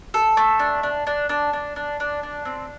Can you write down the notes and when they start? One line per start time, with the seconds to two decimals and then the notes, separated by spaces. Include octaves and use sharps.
0.14 A4
0.37 A3
0.60 D4
0.83 D4
1.07 D4
1.29 D4
1.53 D4
1.76 D4
2.00 D4
2.23 D4
2.45 C4